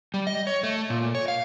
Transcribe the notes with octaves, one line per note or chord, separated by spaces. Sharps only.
G3
D#5
C#5
A3
A#2
C#5
F5